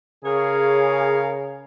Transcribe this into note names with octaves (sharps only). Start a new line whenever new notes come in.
C#3 G#4 A#4 C#5 F5